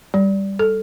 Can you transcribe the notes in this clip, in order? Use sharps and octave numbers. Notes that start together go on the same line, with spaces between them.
G3
A4